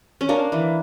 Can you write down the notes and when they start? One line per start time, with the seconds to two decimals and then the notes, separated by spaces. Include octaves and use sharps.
0.21 C#4
0.29 A#3 D4
0.52 E3